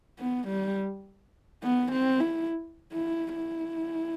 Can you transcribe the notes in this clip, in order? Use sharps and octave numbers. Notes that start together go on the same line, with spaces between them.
B3
G3
B3
C4
E4
E4
E4